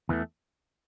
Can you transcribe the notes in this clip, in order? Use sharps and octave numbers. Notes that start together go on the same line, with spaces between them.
E2 E3 A3